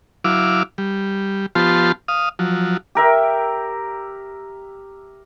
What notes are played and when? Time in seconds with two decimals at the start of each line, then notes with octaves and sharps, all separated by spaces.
0.24 F#3 E4 F5 D6
0.78 G3
1.55 F3 B3 F4 G4 A5 C6
2.08 F5 D#6
2.39 F3 F#3
2.95 G4 A#4 E5